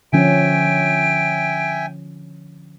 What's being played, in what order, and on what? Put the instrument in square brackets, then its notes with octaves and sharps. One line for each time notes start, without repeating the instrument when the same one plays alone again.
[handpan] D3 F3 C#4 [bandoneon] E5 G5 G#5 [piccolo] D7